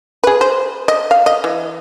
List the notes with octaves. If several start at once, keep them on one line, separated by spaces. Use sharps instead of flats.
G#4 B4
C5
D#5
F5
D#5
E3